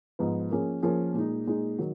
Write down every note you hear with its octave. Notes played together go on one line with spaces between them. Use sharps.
G#2 F3 B3
F3 A#3 C#4 G#4
F3 A#3 C#4 G#4
A#2 G#3 D#4
A#2 G#3 D#4
D#3 F#3